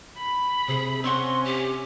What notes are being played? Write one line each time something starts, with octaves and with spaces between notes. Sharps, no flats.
B5
C3 G#4
C4 C#4 C#5 F#5 C6
G4